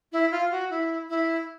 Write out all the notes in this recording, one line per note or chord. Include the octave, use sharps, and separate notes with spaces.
E4
F4
F#4
E4
E4